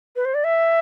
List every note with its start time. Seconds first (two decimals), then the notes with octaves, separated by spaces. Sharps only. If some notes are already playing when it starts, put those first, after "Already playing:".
0.16 B4
0.25 C5
0.34 D5
0.44 E5